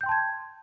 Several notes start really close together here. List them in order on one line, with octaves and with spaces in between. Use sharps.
G6 G5 C6 A5 G#6